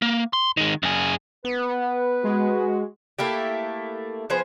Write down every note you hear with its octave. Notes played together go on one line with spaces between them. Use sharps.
A#3
C6
D#3 G#3
F#2 G#4
B3 B4
G#3 F#4
A3 A#3 E4 G4
F3 B3 G#4 C5